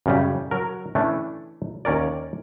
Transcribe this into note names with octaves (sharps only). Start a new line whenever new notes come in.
F#2 C#3 G3
F#3 A#4
E3 A3 C#4 D4
D#2 C#4 A#4 D5